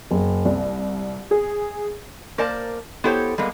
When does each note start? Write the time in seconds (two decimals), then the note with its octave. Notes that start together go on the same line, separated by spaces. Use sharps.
0.11 F#1
0.45 C2
1.31 G#4
2.38 A#3 A#4 C5 D5 A5
3.04 B3 E4 G4 A4 C5 C#5
3.38 G3 G#3 A#3 B3